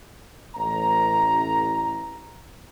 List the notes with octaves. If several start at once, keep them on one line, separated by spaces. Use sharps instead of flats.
A1 A#5